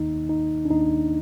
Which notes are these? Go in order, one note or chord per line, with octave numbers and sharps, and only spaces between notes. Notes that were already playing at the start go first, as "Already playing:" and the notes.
Already playing: D#2 D#3 A#3 D#4
D#4
D4
D#2 D#3 A#3 D#4